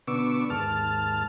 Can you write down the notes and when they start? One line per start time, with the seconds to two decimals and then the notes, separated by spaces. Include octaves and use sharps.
0.07 B2 D3 B3 C#6 D6 E6
0.50 D#2 G#2 A5 F6